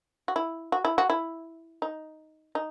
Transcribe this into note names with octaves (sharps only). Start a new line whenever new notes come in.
F#4
E4
F#4
E4
F#4
E4
D#4
D#4